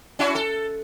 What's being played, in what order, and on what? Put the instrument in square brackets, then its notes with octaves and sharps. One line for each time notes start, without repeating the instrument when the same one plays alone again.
[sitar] C#4 E4 F#4
A4